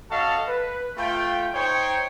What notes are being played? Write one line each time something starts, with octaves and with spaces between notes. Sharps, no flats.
C#4 F#4 A4 D#5 F5 A5
B4
A3 F4 G5
D#4 C5 C#5 G5